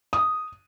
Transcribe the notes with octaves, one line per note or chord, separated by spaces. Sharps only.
D#6